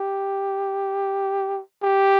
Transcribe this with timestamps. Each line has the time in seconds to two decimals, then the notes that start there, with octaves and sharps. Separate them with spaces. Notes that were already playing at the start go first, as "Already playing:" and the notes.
Already playing: G4
1.83 G4